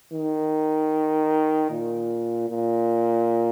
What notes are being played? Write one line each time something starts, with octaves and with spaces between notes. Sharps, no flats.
D#3
A#2
A#2